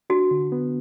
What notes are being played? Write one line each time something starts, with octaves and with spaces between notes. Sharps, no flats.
D4 F#4
D3
B3